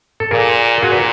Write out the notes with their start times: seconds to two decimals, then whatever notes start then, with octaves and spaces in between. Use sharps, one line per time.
0.20 A4
0.31 A#2 G#4 A#4
0.82 A#2 F#4 G#4
0.92 B4